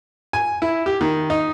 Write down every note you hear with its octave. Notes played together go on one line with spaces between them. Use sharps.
G#5
E4
G4
D#3
D#4